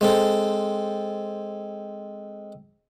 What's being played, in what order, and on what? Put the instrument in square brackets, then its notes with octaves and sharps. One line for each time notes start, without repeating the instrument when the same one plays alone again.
[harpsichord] G#3 C4 A4